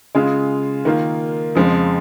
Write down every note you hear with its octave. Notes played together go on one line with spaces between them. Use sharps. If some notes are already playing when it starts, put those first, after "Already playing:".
C#3 G#3 F4
D#3 A#3 F4
F2 C#3 F3 G#3